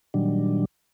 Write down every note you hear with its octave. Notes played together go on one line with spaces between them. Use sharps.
A#2 D#3 F#3 G3 D4